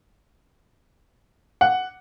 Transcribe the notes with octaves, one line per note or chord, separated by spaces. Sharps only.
F#5